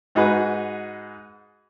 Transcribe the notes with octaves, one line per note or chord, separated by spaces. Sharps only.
G#2 D#4 F#4 G#4 B4